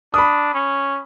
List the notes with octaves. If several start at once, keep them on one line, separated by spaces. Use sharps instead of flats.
D4 B5 D#6
C#4